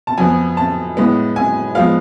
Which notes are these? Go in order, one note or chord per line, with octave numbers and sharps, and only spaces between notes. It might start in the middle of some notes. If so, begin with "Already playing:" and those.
A5
F2 F3 B3 G#5
A5
A2 G#3 B3
G#5
F3 G#3 B3 F5